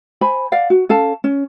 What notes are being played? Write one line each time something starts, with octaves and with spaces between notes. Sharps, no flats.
C5 G#5 B5
D5 F5 F#5
F#4
C#4 A4 F5 A5
C#4